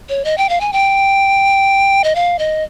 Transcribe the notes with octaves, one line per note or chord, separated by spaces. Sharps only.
C#5
D#5
G5
F5
G#5
G5
D#5
F5
D#5